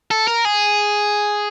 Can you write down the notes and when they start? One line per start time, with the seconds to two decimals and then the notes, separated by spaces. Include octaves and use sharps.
0.11 A4
0.27 A#4
0.45 G#4